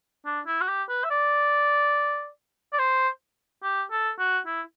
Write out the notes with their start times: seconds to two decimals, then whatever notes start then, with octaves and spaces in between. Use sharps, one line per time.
0.25 D4
0.46 E4
0.61 F#4
0.68 G4
0.89 B4
1.04 E5
1.10 D5
2.73 D5
2.79 C5
3.63 G4
3.91 A4
4.19 F#4
4.47 E4